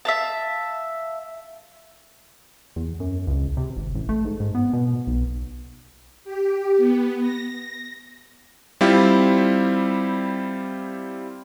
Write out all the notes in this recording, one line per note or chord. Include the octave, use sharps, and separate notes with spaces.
E5 F5 A5
E2
F#2
C#2
C3
G#1
A1
A3
G#2
G#2
B3
B2
B1
G4
B3
A#6
G3 C4 E4 F4 G4